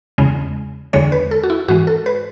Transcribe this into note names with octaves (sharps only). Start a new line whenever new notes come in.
E2 C#3 G#3
E2 D3 G#3 C#5
B4
A4
F#4
E4
G#2 E3 G#3 F#4
A4
B4